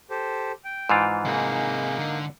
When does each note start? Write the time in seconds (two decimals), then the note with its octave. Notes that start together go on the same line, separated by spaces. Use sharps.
0.10 G4 A4 C5
0.64 G5
0.89 G#2 E3 F4
1.25 C3 A#3 D#4 G#4
1.99 D3